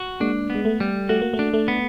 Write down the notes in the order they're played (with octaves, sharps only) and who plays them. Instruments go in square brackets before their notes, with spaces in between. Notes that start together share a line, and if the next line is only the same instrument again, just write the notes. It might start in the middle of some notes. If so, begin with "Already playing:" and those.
Already playing: [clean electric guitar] F#4
[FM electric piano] G#3 A#3 [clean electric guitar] D4
[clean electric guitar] B3
[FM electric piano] G#3
A3
[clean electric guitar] G3
[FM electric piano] A3 [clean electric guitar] F#4
[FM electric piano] A#3
A3
[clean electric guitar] D4
[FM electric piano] A3
[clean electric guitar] B3